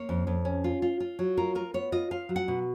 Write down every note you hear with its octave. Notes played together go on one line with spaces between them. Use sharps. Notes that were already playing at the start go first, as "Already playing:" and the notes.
Already playing: A#3 C#5
F2
F2
C#4
F4
F4
F4
F#3
F4 A#4
F4 A#4
B3 C#5
F4 D#5
F4 F5
F#3
F#5
B2